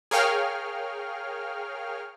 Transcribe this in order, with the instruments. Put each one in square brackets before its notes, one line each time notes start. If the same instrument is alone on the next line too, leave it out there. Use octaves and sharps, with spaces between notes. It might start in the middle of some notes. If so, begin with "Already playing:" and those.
[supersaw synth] G#4 A#4 C#5 F5 G5 F6